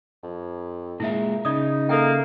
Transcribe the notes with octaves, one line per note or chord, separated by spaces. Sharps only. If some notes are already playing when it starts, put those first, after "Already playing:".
F2
A#2 G#3 A#3 E4 E5
C#3 D#4 D5 D#6
A#3 A4 E5 G5